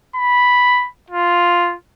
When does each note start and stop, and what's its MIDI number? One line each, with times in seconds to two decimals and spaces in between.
0.16 0.88 83
1.10 1.75 65